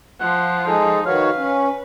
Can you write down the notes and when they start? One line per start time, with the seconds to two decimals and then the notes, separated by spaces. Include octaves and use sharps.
0.20 F3 F4 F#5
0.67 G#3 D#4 G#4 A4
1.06 D#3 F#4 B4 C#5 F5
1.37 C#4